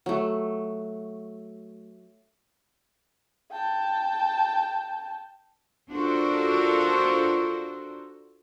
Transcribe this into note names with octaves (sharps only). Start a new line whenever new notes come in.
F#3 A3
G5 A5
D4 F4 F#4 A4 A#4 C5